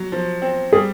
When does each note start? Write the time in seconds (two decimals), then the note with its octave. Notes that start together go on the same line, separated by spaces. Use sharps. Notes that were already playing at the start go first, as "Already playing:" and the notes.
Already playing: F#3
0.12 F3
0.42 C4
0.72 G3 G#4